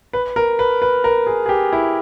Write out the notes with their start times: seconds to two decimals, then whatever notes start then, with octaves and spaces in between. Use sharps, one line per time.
0.13 B4
0.36 A#4
0.59 B4
0.82 B4
1.04 A#4
1.27 G#4
1.46 G#4
1.49 G4
1.73 E4